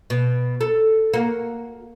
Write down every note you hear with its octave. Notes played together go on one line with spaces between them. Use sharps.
B2
A4
A#3 F#4